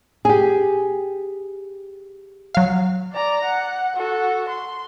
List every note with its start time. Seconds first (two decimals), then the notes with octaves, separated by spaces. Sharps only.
0.25 G4 G#4
2.55 F#3 F5
3.13 D5 A#5
3.44 F#5
3.96 F#4 A4
4.49 C6